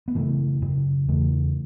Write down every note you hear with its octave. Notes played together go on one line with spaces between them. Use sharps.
B3
F#2 C#3 E3 A3
F#2 C#3
E2 C#3 E3 A3